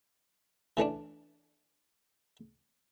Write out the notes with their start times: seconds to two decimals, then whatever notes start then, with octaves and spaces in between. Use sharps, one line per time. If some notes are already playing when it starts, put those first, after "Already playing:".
0.77 E3 A3 C#4 D4